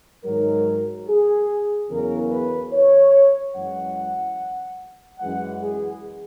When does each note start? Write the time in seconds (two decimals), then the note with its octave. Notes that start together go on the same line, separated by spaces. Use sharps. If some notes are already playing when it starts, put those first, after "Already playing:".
0.24 G#2 D#3 F#3 A#4
1.07 G#4
1.90 E2 C#3 F#3 A#4
2.31 B4
2.73 C#5
3.55 F#2 E3 G#3 F#5
5.19 F#2 E3 G#3 F#5
5.62 G#4